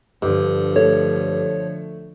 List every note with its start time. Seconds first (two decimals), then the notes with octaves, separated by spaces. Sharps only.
0.22 G2 D3 F3
0.76 A3 C#5